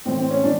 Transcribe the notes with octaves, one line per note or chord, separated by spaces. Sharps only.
A2 E3 C4
C4
C#4
E3 D4